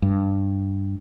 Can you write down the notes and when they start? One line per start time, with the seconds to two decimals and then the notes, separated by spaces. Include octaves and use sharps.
0.02 G2